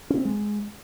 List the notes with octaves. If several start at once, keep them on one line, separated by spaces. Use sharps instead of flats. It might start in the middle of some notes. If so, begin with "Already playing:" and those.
C#4
C4
G#3